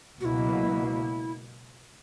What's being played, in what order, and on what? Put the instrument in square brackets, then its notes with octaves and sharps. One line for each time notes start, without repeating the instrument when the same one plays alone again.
[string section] C#2 B2 F#3 A#3 [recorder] E4 F#4